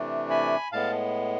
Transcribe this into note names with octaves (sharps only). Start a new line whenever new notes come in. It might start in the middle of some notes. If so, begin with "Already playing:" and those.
Already playing: C3 E3 A3 D4
G#5 B5
A2 G#3 B3 F5 A5